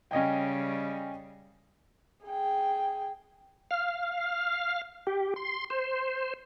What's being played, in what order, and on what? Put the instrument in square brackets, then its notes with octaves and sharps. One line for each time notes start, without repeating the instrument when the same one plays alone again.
[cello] C#3 G3 [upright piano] C#4 D#5 G5
[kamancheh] G#4 G5
[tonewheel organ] F5
G4
C6
C5